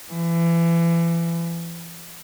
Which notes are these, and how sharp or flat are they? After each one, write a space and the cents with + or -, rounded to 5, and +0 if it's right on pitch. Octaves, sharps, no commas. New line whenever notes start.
E3 +30